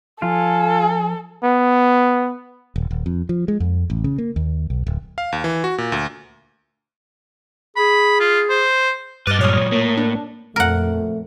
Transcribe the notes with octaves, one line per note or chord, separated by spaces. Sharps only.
F3 F4 A4 G#5
B3
D#1
D#1
F2
F3
G#3
F2
A1
C#3
A#3
D#2
B1
D1
F5
D#2
E3
F#4
A#2
D2
G#4 B5
F4
C5
G2 B4 D#5 D6 F6 F#6 A6
A#2 F#3 G#3 C#5 D#6
A2 A#3
D4
F2 A#2 A3 A#4 F#5